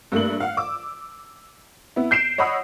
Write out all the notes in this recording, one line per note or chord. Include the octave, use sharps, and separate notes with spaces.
G2 A3 A#3 F#7
F5 F#5
D6 E6
B3 E4
G6 C7 D7 E7
C#5 D#5 F#5 B5 D#6 E6